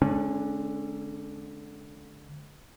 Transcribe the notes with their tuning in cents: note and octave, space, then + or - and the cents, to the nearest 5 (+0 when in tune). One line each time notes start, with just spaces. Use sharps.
D3 +0 G#3 +35 C#4 -25